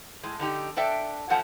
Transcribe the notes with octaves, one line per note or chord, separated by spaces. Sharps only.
A2 G#3
D3 D#4 G4
D4 A4 D5 E5 G5
F#2 F3 A3 C#4 F#5 A5